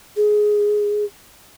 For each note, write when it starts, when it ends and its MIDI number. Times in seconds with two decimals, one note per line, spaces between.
0.17 1.05 68